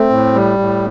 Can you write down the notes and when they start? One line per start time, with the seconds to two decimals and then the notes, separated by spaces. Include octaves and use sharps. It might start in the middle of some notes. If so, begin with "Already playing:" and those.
Already playing: A3 C4
0.10 A2
0.34 G3
0.59 A2